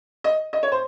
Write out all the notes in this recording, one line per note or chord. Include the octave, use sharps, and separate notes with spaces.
D#5
D#5
C#5
C5